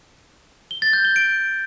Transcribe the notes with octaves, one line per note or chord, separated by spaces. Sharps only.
G7
A6
G6
G7
D7